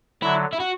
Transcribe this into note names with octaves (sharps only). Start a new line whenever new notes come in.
D3 F#3 E4
E4
F#4